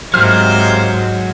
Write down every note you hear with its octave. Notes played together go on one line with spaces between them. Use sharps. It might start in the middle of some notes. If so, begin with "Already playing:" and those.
G#2 C3 F#3 G#3 A#3 C5 F6